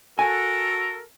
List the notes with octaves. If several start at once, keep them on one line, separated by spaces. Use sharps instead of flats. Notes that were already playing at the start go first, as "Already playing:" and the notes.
F#4 A4 A#4 G#5